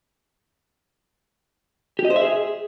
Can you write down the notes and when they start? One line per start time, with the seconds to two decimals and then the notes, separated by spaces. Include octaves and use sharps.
1.99 G4
2.05 D#5
2.10 C5
2.16 E5
2.22 G#4